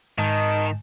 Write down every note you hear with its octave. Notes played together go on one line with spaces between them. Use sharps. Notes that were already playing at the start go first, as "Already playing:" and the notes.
G#2 D#3 D#5 A5